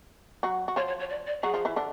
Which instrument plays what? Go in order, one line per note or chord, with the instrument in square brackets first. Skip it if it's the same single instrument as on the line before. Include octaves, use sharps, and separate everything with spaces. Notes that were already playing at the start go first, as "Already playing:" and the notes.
[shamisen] F#3 F#4
F#4
[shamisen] F3 F4 [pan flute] C#5
[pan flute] C#5
C#5
D5
D5
[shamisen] F#3 F#4 [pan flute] G#4
[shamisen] F3 F4
E3 E4
D3 D4